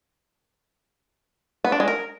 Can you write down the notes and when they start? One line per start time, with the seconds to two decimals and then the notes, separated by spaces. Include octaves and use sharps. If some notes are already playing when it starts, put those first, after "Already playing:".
1.65 B3
1.72 D4
1.80 G#3
1.88 A#4